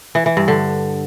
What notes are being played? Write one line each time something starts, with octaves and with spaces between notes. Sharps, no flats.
E3
E3
G2
D3